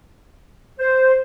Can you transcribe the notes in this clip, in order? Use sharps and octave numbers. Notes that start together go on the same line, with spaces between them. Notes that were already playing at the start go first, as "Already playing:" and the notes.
C5